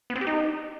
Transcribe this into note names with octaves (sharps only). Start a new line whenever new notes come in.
B3
C4
G4
D#4